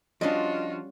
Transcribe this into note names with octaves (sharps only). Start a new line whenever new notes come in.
F3 G3 C#4 D4 F4 F#4 D#5